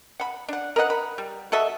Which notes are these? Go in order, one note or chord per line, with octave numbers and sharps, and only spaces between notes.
F#5 B5
D4 F#5
A#4 B4 D#5 F#5
B5
G3
F#4 A4 D#5 E5